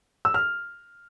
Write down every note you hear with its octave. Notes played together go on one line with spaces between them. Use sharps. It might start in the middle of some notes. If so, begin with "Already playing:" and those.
E6
F6